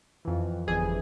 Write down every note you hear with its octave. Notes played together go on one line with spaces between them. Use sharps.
F2 E3
G1 F2 E3 G#4